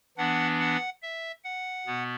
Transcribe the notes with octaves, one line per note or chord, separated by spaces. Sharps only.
E3 B3 D4 F#5
F#5
E5
F#5
B2 B3